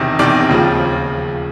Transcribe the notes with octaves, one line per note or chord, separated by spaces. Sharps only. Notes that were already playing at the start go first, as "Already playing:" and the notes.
Already playing: E1 E2 C3 D#3
E1 E2 C3 D#3 D5
D#2 C#3 F3
F3